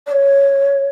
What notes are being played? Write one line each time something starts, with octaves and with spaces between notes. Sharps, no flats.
D5
C#5